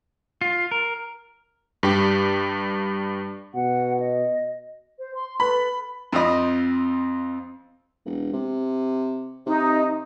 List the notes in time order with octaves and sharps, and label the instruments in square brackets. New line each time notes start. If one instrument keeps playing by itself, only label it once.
[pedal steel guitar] F4
A#4
[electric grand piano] G2 G4
[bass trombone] B2 [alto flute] F#5
[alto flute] D#5
[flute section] C5
C6
[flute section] A4 B4 [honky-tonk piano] B5
[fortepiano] F2 C4 F4 D#5 B5
[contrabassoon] E1
C3
[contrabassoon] C3 [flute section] D#4